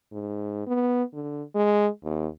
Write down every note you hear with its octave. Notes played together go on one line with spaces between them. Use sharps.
G#2
B3
D3
G#3
D#2